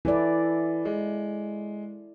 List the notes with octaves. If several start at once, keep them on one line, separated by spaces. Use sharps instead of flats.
E3 E4 A4 D5
G#3